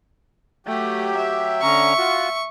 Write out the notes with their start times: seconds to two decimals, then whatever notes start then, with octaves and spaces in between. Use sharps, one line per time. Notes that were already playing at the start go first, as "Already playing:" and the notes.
0.67 F#3 A3 G4
1.17 E5
1.62 D3 C#4 A#5 C#6
1.98 F4 F#4